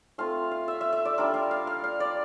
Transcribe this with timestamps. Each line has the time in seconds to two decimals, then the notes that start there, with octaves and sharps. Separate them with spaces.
0.18 A3 C4 F4 F5
0.51 F5
0.68 E5
0.81 E5
0.93 E5
1.05 D5
1.18 G3 D4 F4 A#4
1.34 F5
1.51 F5
1.67 F5
1.84 F5
2.00 D5